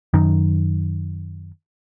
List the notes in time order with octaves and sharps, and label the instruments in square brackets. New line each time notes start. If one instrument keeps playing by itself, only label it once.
[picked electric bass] F#2 D#3